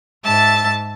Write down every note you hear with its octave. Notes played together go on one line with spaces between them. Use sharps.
G#2 E5 A5 A6